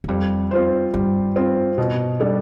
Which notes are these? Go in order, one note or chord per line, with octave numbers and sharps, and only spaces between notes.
E2
F2 G3
C4 F4 C5
G2 G3
C4 F4 C5
B2
G3 D4 A4 D5